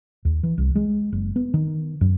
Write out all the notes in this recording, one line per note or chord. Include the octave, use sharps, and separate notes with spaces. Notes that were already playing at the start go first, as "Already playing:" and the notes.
D#2
E3
C2
G#3
F#1
B3
D#3
F#2